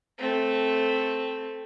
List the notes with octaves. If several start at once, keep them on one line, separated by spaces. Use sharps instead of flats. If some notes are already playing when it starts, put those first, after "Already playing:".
A3 C4